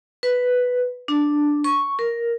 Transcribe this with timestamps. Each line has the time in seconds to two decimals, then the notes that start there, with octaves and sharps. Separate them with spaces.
0.23 B4
1.08 D4
1.64 C#6
1.99 A#4